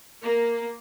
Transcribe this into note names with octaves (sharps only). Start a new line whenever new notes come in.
A#3